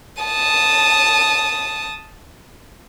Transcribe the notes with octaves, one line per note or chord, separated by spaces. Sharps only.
A5 D#6